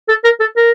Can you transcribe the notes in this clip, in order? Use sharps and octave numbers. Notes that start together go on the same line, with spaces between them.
A4
A#4
A4
A#4